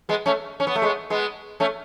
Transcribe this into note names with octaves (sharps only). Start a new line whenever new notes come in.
G#3 B3
A3 C#4
C#4
B3
A3
G#3 B3
G#3 B3
A3 C#4